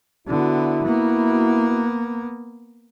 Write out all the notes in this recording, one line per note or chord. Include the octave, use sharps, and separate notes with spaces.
D3 B3 E4 F#4
A#3 B3